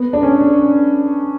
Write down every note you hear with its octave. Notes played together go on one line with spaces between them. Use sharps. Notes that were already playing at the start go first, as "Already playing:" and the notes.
Already playing: B3
D4
C#4